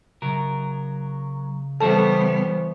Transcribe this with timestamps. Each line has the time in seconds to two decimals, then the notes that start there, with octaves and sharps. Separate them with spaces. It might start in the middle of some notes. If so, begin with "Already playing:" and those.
0.22 C#3 F#3 A#4
1.80 E3 G3 B3 A4 C5 C#5 A5